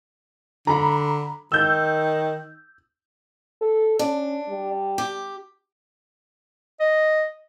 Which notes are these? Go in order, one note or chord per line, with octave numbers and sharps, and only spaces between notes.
D3 A#5 B5
D#3 E6 G6
A4
C#4 D4
G3
G4
D#5